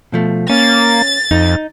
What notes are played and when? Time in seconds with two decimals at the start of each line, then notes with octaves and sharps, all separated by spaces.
0.12 B2 F3 A3
0.50 A#3 C#4 A6
1.31 F2 D#4